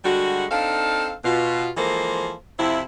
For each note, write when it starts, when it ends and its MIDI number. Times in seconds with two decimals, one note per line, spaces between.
0.05 0.45 50
0.05 0.45 55
0.05 0.45 56
0.05 0.45 66
0.50 1.13 60
0.50 1.13 62
0.50 1.13 63
0.50 1.13 69
0.50 1.13 77
1.24 1.70 47
1.24 1.70 65
1.77 2.33 52
1.77 2.33 53
1.77 2.33 56
1.77 2.33 58
1.77 2.33 69
1.77 2.33 72
2.58 2.82 41
2.58 2.82 48
2.58 2.82 60
2.58 2.82 64